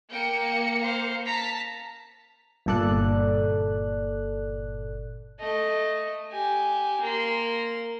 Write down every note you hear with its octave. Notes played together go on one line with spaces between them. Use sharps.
A#3 G5 C#7
C5 F5
A5 A#5 B6
G1 A#2 A4 D5 F#6
A3 D#5
G4 G#5
A#3 C6